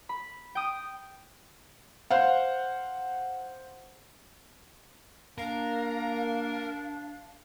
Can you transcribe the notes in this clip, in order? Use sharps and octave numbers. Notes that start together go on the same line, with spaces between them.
B5
G5 D#6
C5 F5 F#5
A#3 D4 A#4 F5